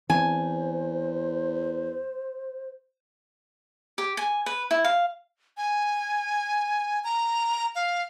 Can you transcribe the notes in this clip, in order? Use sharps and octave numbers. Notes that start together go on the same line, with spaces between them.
E2 E3 C4 C5 G#5
G4
G#5
B4
E4
F5
G#5
A#5
F5